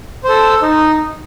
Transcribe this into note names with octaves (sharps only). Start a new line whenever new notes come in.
A4 C5
D#4